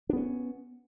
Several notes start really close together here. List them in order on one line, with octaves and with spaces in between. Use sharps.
D4 B3 C#4